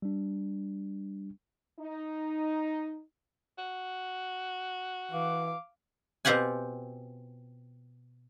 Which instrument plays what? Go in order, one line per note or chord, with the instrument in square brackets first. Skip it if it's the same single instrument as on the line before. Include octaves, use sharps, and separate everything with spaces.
[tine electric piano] G3 D4
[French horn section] D#4
[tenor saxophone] F#4
[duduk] E3 [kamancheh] F5 D6
[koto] B2 C4 F4 G4 F#5 G#5